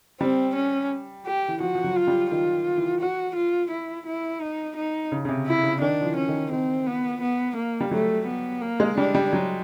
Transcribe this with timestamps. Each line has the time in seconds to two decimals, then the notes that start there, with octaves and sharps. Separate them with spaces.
0.20 G3 C4
0.55 C#4
1.26 G4
1.48 E3
1.60 F3 F#4
1.75 F3
1.84 F#3
1.96 F4
2.07 G3
2.31 D#3 F4
2.77 E3
3.00 F#4
3.36 F4
3.71 E4
4.06 E4
4.41 D#4
4.76 D#4
5.12 C#3
5.25 C#3
5.29 C3
5.46 E4
5.63 C#3
5.81 D#3 D4
6.01 F3
6.05 E3
6.17 C#4
6.28 D#3
6.52 D#3 C4
6.87 B3
7.22 B3
7.57 A#3
7.81 G3
7.91 F#3 A3
8.27 B3
8.62 A#3
8.80 G#3
8.97 G3 D4
9.15 G3
9.33 F#3